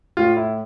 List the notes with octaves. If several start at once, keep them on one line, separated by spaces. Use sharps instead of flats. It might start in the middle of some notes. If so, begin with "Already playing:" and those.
A2 F4
E4